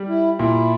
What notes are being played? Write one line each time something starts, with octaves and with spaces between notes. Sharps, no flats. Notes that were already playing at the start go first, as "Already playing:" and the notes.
Already playing: G3
E4
A#2 E4